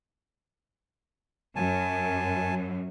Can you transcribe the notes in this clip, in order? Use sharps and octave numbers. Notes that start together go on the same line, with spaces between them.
F#2 G#5 A5